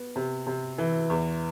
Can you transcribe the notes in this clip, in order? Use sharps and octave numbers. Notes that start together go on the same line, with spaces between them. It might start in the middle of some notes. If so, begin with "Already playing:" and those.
Already playing: B3
C3
C3
E3
E2